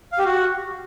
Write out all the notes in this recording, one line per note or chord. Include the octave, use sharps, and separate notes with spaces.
F5
G4
F#4